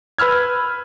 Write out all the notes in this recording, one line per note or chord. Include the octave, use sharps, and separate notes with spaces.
B4 B5 E6 F6 G#6